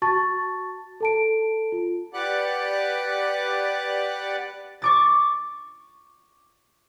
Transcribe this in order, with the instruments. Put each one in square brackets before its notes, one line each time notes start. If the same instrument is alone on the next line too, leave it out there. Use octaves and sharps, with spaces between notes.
[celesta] F#4 A5 C#6 A6
A4 A5 D7
F4
[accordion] G4 B4 D5 F#5 D6 F#6
[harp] C#6 D6 A6